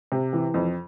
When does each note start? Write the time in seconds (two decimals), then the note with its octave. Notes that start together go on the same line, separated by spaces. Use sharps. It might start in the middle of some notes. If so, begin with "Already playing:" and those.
0.12 C3
0.33 E3
0.54 F2